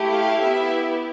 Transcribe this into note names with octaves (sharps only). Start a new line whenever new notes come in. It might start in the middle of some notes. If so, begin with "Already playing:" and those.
Already playing: A3 E4 G4
F5
B3 E4 G4 E5